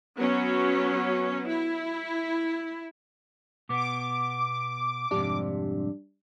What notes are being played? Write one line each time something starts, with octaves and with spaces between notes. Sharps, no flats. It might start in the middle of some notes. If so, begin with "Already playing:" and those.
F#3 B3 C#4
E4
B2 B3 D6
F2 G#2 C3 G3 D4